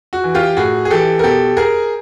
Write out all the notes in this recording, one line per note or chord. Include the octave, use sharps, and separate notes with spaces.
F#4
E3
F4 G4
A2 F#4 G#4
G#4
E3 G4 A4
A#4
B2 G4 A4
G#4 A#4